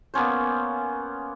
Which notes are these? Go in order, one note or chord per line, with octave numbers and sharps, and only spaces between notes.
A#3 B3 C#4 C5